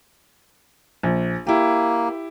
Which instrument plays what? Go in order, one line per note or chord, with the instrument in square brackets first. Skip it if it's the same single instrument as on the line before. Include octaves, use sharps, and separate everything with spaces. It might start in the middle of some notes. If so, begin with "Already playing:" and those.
[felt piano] A#1
[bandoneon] A#3 [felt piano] E4 G4